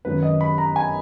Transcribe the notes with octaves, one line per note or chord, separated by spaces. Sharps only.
G#1 F#2 D#3 B4
D#5
B5
A#5
G#5